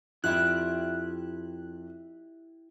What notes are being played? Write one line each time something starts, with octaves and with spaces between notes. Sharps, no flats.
F2 E4 G4 E5 F#6